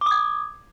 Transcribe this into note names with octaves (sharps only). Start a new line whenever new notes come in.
D6 D#6 G#6